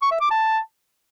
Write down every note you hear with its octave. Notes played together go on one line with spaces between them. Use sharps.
C#6
E5
D6
A5